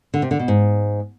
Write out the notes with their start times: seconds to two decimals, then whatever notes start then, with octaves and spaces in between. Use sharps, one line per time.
0.14 D3
0.22 C3
0.31 D3
0.39 B2
0.48 G#2